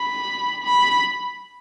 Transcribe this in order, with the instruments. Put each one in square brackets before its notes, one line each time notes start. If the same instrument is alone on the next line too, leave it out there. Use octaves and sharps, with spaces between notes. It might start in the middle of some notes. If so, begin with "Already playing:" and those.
Already playing: [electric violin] B5
B5